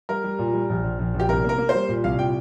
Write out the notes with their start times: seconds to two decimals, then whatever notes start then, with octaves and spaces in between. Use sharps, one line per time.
0.09 G3 A#4
0.24 G3
0.39 A#2
0.53 G3
0.69 A#1
0.84 A#1
0.99 A#1
1.14 A#1
1.20 G4
1.28 C2 A#4
1.44 A#3 A#4
1.58 A#3
1.69 C5
1.75 G3
1.89 A#2
2.04 C2 F5
2.19 A#2 G5